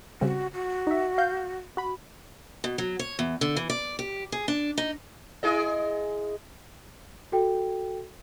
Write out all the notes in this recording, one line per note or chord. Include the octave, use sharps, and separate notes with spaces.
C#3 G3 C4 F#4
F#4
D#4 E5
F5 G6
F#4 B5
B2
F#3
C#5
E2
D3
E3
D5
G4
G#4
D4
D#4
E4 G#4 D#5
F#4 A4 G5